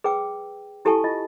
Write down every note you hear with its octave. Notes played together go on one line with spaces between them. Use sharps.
G#4 B4 G5 D6 E6
E4 G4 A4 G#5 A5 C#6
F4 D#5